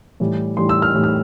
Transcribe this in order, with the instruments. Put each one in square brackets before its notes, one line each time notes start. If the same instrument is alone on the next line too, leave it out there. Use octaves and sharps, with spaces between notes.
[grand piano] A2 E3 G3
A2 E3 G3 C6
E6
F6
A2 E3 G3
F6